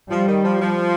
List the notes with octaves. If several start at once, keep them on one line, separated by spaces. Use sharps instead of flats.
F3 G3
D#3
F3
F3